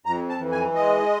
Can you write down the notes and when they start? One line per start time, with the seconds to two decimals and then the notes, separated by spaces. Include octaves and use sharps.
0.06 F2 A#5
0.29 A5
0.40 E3
0.52 G#5
0.75 G#3 D#5